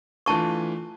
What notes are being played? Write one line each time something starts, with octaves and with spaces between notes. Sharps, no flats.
E3 A3 D4 F4 A5 C#6